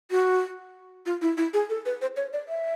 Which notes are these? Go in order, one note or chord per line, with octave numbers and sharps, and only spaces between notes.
F#4
F4
E4
E4
G#4
A4
B4
C5
C#5
D5
E5